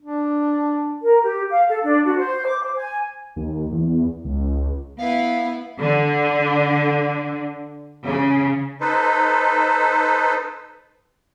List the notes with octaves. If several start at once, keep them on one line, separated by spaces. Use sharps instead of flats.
D4
A#4
G4
F5
A4
D4
F#4
C5
D6
C5
G#5
D#2
E2
C#2
B3 E4 B4 F5
D3
C#3
D#4 A4 B4 C5